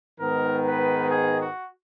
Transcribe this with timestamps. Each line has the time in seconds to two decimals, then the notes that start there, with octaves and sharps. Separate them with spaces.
0.19 G#2 D#3 G#3 B3 D#4 A#4
0.66 B4
1.10 G#4
1.40 F#4